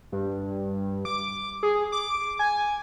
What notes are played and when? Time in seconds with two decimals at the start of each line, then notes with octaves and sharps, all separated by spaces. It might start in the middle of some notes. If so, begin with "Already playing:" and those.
0.12 G2
1.05 D6
1.63 G#4
1.92 D6
2.39 G#5